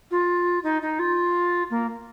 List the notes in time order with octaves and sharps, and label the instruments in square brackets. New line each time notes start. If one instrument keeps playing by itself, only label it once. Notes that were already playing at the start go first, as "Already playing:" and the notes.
[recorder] F4
D#4
D#4
F4
A#3